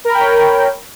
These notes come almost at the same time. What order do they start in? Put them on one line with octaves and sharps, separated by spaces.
A#4 B5 G5 C#5